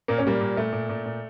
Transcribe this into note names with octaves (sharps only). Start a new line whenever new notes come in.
A#2 A#3
C#4
A#2 G3 A#3
A#2
A#2 A3
A#2
A#2
A#2